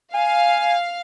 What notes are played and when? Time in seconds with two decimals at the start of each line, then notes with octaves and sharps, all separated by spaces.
0.14 F5 G#5